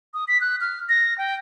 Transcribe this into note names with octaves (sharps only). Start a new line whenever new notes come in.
D#6
B6
F#6
F6
A#6
G5